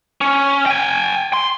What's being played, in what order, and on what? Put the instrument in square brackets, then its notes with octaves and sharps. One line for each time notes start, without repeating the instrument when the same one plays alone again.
[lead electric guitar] C#4
G5 G#5
C6